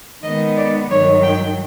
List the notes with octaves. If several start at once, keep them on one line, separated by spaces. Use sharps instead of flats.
D#3 G#3 B3 D#5
D5
G2 D#3 F#3 C#5
G5